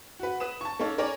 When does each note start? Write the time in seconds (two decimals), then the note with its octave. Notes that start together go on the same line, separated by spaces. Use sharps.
0.20 F#4 B4
0.40 B4 D#6 E7
0.61 A5 C#6
0.79 A#3 C#4 D#4 A4 C#5
0.98 D#4 A#4 C#5 D5 G#5 A#5